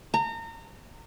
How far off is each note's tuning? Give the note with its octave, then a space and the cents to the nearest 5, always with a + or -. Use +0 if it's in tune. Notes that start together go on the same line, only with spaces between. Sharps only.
A#5 -30